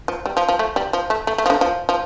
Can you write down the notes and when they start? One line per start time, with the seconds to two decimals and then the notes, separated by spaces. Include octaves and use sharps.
0.08 F3
0.26 G3
0.37 F3
0.49 F3
0.59 A3
0.76 G3
0.93 F3
1.10 A3
1.27 A3
1.38 A3
1.46 F3
1.50 D3
1.61 F3
1.89 F3